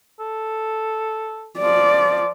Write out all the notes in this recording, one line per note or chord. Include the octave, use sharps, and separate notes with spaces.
A4
F3 D5